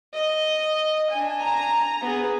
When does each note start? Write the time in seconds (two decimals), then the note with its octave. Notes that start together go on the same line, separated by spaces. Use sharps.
0.13 D#5
1.10 D4 G#5
1.41 A#5
2.01 B3 G#4